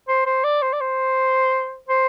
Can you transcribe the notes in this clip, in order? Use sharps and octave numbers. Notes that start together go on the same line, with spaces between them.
C5
C5
D5
C5
D5
C5
C5